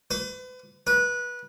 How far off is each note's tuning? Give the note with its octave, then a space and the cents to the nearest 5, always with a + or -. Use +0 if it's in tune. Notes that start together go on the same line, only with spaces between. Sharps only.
B4 +40
B4 -20